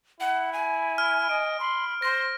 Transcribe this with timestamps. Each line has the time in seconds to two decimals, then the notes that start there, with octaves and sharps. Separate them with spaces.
0.20 E4 F#5
0.53 G#5
0.98 F6
1.29 D#5 D7
1.60 B5 C6
2.02 C5 C6 A#6